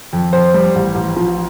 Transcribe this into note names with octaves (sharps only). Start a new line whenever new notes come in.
F2
F2 C5
G3
A1
A1
F3